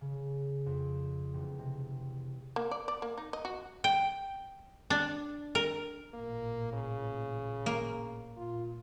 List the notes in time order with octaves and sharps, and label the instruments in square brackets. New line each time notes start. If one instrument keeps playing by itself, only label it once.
[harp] C#3
F2
E1
C3
[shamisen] A#3
D5
D5
A#3
D#4
D#5
F#4
[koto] G5
D4
A#4
[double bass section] A1 A#2 [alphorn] A#3
[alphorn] C#3
[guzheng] A#3
[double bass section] A#2 [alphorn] F4